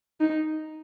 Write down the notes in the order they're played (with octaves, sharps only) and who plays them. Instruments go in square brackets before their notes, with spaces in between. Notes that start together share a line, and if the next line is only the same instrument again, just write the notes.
[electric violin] D#4